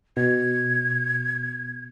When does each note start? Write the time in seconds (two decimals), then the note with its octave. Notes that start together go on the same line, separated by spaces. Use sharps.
0.17 B2 G#6